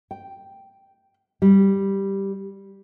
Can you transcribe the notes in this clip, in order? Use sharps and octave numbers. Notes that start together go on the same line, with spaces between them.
G5
G3